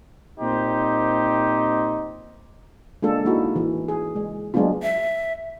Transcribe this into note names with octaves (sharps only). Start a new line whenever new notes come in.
A#2 C4 D#4 G4 C5
G#3 A#3 D4 F4 A4
G#3 A#3 D#4 E4 F#4
E3
G#4
G#3
F#3 G#3 A#3 B3 D4 F4
E5